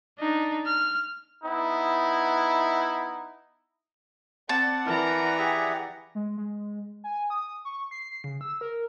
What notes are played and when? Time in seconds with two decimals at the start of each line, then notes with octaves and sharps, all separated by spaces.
0.19 D4 D#4
0.66 F6
1.44 B3 D#4 E4
4.49 C4 D5 F#5 A5
4.86 E3 A#4 A#5
5.38 G4 G#4 E5
6.15 G#3
6.38 G#3
7.04 G#5
7.30 D#6
7.65 C#6
7.91 C7
8.24 C#3
8.41 E6
8.61 A#4